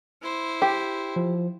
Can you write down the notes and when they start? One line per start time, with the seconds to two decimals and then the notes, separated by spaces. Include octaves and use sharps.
0.22 E4 C5
0.62 G4
1.16 F3